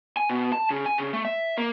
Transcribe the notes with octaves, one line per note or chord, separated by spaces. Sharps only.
G#5
B2
A5
C#3
G#5
C#3
A3
E5
A#3